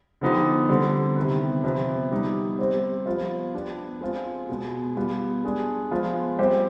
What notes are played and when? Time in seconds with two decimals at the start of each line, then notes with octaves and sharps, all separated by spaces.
0.21 D3 F3 B3 D#4 G4
0.69 D3 G3 C4
1.16 C3 D#3 B3
1.64 C3 F3 B3
2.11 G3 B3 D#4 G4
2.59 G3 C4 G4 C5
3.06 F3 B3 F4 C5
3.54 B3 D4 G4
4.01 G#3 C4 F4
4.49 B2 G#3 B3
4.96 G3 B3 F4
5.44 G#3 D4 G#4
5.91 F3 G#3 B3 F4
6.39 G3 C4 G4 C5